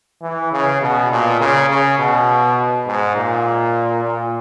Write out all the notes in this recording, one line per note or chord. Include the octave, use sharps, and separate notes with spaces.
E3
C#3
B2
A#2
C#3
C#3
B2
G#2
A#2
A#2